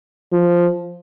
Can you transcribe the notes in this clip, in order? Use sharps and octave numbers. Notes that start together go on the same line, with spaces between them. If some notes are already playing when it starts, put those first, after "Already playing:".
F3